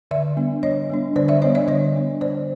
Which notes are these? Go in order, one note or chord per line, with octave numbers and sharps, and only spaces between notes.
D3 D5 E5
G3 B3 D4
D3 C#5 D#5
G3 B3 D4
D3 C5 D5
D5 E5
G3 B3 D4 C#5 D#5
D5 E5
D3 C#5 D#5
G3 B3 D4
D3 C5 D5